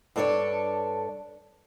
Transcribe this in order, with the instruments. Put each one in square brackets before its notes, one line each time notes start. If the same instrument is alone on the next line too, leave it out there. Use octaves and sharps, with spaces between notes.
[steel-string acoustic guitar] G2 D4 A4 C#5 D5